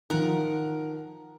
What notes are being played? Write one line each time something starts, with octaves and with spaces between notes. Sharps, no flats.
D#3 F3 A#4 F#5